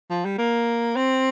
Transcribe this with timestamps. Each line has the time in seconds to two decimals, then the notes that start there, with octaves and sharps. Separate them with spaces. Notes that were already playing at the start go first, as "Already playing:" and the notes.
0.10 F3
0.25 G3
0.38 A#3
0.96 C4